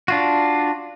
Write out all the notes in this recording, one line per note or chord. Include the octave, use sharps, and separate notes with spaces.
D4 F4 F#4